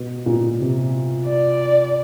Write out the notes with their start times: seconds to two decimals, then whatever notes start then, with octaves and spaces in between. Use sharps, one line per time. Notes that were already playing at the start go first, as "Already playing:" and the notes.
Already playing: B2
0.26 A#2
0.60 C3
1.26 D5